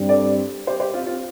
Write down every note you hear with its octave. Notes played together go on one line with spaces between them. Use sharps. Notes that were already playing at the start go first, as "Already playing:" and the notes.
Already playing: G2 G3 C4
A4 D5
G4 C5
G4 C5
C4 F4
C4 F4